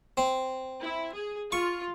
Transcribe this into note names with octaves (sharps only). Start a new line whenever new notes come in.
C4
E4
G#4
F4 C#6